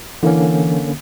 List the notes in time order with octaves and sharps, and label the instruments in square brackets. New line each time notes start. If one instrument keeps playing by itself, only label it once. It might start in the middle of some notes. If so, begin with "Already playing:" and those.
[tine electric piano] D3 A#3 C#4 [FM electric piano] E3